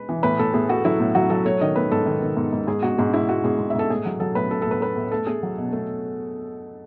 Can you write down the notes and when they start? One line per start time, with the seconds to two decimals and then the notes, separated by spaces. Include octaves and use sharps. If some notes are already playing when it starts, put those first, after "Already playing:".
Already playing: G#3 B4
0.09 E3
0.23 A2 B4
0.39 A2 A4
0.54 A2 G#4
0.69 A3 F#4
0.85 F#3 E4
1.00 A2
1.15 F#3 F#4
1.30 F#3 A4
1.45 A3 C#5
1.61 D#3 D#5
1.76 A3 B4
1.91 G#2 A4
2.06 D#3
2.22 D#3
2.37 G#2
2.53 G#2
2.67 G#2 G#4
2.83 G#2 F#4
2.98 G#2 G#4
3.13 G#3 E4
3.29 G#3 F#4
3.44 G#2 G#4
3.59 G#2
3.70 E5
3.75 G#2 A4
3.90 A2 G#4
4.05 F#3
4.20 F#3 A4
4.35 A2 B4
4.51 A2 A4
4.62 A4
4.66 A2
4.71 B4
4.81 A3 B4
4.96 A2
5.12 A3 A4
5.27 A3 G#4
5.43 F#3
5.58 B2
5.73 A3